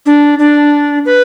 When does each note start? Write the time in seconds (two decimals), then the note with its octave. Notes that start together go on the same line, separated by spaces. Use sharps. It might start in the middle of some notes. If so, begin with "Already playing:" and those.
0.06 D4
0.39 D4
1.05 B4